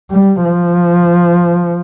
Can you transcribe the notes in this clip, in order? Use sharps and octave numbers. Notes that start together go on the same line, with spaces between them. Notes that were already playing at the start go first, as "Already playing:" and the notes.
G3
F3